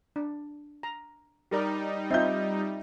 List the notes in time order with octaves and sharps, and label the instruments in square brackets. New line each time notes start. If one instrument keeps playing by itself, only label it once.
[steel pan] D4
A#5
[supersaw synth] G3 D#4 [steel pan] G4 A#4 D5
[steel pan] C4 F4 [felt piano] D#5 E5 G6